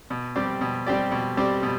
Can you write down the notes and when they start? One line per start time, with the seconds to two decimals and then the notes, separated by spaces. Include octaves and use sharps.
0.10 B2
0.36 G3 C4 G4 D5
0.61 B2
0.86 G3 C4 G4 D5
1.12 B2
1.37 G3 C4 G4 D5
1.63 B2